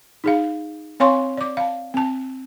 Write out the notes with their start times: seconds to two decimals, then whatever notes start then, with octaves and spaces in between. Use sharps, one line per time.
0.24 D#4 G#4 F5
1.00 C4 C#5 F5 G#5 C6 C#6
1.38 D5 D6
1.57 F5 A5
1.94 C4 A5